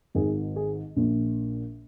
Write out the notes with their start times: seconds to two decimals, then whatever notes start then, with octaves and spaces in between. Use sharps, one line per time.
0.14 G#1 G#2 D#3 G#4
0.56 G#4
0.96 A#1 A#2